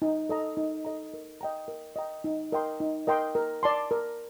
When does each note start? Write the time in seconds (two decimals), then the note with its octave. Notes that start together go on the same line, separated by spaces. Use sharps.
0.02 D#4
0.29 A4 D#5 A#5
0.57 D#4
0.85 A4 D#5 A#5
1.14 A#4
1.41 D#5 G5 A#5
1.68 A#4
1.96 D#5 G5 A#5
2.24 D#4
2.52 A#4 D#5 G5 C6
2.80 D#4
3.07 A#4 D#5 G5 C6
3.35 A#4
3.63 D5 A5 C6
3.91 A#4